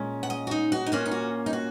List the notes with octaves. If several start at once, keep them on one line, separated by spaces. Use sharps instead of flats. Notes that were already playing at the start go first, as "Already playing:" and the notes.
Already playing: A#2 G#3 C#4
F#5
D#5
F#4
D#4
F#4
D#4
A#2 A#3 C#4 F#4
D#4
F#4
D#4
F#4